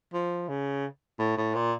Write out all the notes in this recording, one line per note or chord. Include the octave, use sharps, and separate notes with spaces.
F3
C#3
A2
A2
A#2